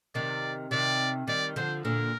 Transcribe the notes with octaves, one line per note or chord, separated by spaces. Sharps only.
C3 D#3 D5
C3 D#3 D5
D#3 G3 D5
D3 F3 C5
A#2 D3 A#4